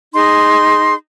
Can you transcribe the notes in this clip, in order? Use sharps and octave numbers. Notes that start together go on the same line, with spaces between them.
D#4 G#4 C6